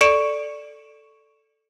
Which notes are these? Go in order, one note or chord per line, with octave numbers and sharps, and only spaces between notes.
A4 D5 C#6 C#7 D7 E7